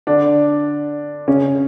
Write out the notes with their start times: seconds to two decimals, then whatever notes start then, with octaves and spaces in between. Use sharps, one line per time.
0.07 D3 D4
1.28 C#3 C#4